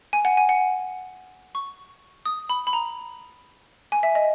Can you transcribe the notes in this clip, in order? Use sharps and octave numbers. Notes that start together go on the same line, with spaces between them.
G#5
F#5
G#5
F#5
C#6
D#6
B5
B5
A#5
G#5
E5
D#5